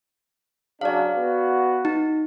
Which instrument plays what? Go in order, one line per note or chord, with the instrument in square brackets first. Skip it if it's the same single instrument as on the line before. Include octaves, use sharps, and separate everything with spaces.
[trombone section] C#3 F#3 D4 [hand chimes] D5 F5
[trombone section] B3 F#4
[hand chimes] D#4